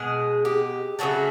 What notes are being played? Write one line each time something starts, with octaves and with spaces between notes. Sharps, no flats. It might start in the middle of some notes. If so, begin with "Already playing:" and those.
Already playing: B2 G#3 G#4
G4
C#3 F#3 A3 F#4